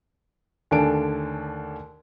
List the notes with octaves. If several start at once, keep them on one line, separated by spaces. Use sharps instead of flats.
D#2 D3 A3 D4 G#5 D7